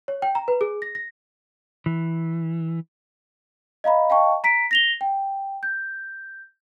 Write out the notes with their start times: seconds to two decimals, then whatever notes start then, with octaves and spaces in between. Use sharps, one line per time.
0.08 C#5
0.22 G5
0.35 A#5
0.48 B4
0.61 G#4
0.82 A#6
0.95 A#6
1.86 E3
3.84 D#5 F5 A#5 B5
4.09 D#5 F5 G5 A5 C#6
4.44 A#5 B6 D7
4.71 A#6 F7 G7
5.01 G5
5.63 G6